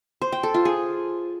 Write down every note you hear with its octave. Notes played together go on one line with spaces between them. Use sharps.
C5
G5
A4
F4
G#4